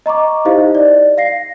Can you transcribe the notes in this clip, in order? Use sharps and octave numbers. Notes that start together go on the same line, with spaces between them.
D#5 A#5 C#6 D6
D#4 E4 G4 C5 D#5 F5
D5
F5 A#6 C7